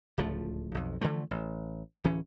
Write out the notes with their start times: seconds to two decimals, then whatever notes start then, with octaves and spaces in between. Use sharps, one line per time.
0.18 D1 C#2 F3 A3
0.74 B1 F2
1.01 D3 E3 F3 A3
1.31 A1
2.04 D1 E3 C#4